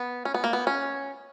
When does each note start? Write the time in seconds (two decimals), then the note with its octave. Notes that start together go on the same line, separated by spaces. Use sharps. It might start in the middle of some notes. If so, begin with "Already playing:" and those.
Already playing: B3
0.25 C#4
0.34 B3
0.44 A#3
0.53 B3
0.67 C#4